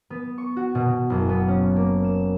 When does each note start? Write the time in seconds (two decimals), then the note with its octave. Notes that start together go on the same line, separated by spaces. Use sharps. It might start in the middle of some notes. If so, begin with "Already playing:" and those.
0.10 B3
0.38 C#6
0.56 F#4
0.75 B2
0.88 B2
1.10 F#1
1.29 B3
1.48 C#4
1.76 A#3
2.04 E7